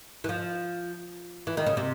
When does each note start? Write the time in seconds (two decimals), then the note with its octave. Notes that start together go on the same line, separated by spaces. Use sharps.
0.24 E3
0.29 F3
1.47 E3
1.57 D#3
1.66 C#3
1.77 C3